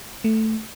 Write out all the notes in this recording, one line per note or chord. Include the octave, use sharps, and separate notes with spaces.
A3